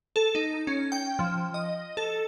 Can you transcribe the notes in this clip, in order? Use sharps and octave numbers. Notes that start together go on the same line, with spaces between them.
A4
D#4
C#4
G5
F3
D#5
A4